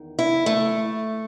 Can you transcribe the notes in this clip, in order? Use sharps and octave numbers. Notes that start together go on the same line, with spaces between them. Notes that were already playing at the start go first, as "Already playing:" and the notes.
Already playing: E2 D#3
E4
A3